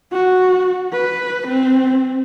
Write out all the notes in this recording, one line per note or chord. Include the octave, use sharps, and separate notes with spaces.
F#4
B4
C4